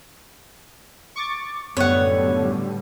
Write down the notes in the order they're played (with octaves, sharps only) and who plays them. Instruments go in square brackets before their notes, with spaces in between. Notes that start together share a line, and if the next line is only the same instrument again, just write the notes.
[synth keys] C#6 D6 A6
[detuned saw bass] F#2 [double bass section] A2 D3 G3 [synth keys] B3 [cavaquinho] C#5 F#5